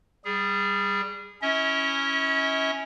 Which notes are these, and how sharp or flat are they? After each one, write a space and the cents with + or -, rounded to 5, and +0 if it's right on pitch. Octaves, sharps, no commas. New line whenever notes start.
G3 +0 G#4 -20
C#4 +0 E4 +0 E5 -45